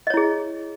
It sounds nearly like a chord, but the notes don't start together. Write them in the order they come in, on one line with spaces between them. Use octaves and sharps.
D#5 C#5 E4 G#4